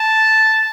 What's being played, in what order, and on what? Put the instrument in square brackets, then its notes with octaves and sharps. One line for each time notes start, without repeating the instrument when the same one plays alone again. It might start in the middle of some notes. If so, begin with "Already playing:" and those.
Already playing: [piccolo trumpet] A5